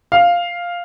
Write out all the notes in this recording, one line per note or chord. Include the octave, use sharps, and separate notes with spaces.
F5